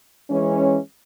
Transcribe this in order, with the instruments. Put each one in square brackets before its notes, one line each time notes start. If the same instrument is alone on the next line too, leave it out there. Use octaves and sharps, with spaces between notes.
[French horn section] E3 G#3 C#4